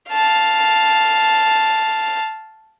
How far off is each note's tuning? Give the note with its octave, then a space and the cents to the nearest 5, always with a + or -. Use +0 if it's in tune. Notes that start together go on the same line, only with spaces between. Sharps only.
F5 +0 A5 +0